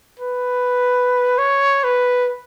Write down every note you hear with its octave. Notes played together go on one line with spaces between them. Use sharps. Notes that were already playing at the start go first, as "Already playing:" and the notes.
B4
C#5
B4